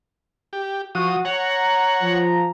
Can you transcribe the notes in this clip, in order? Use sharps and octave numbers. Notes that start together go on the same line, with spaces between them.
G4
F3 F#4 D#6
C#5 F#5 A#5
F3